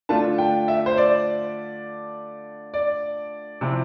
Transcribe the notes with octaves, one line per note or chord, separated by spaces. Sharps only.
D3 A3 D4 F4 A5
G5
E5
C5
D5
D5
C3 F3 C4 E4